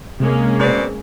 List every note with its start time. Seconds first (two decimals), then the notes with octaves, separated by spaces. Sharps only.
0.20 C3 G#3 A#3 C#4
0.59 B2 C4 D5